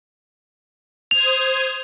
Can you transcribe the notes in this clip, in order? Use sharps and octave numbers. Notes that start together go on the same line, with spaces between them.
C5 D#6 G#6 F7